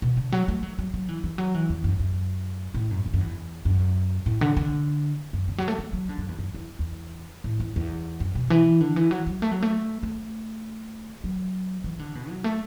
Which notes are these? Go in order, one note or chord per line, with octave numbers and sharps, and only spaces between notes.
B2
D3
F#3
A3
F#3
F#3
F#3
E3
E3
F#3
E3
E2
F#2
F#2
A2
F#2
E2
F#2
E2
F#2
A2
D3
D3
F#2
D3
F#3
A3
F#3
F#3
D3
F#2
E2
F#2
E2
E2
A2
E2
E2
F#2
B2
E3
D3
E3
F#3
F#3
A3
F#3
A3
A3
F#3
E3
D3
B2
F#3
A3